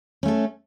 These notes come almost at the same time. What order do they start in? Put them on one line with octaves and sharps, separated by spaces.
C#4 A3 A4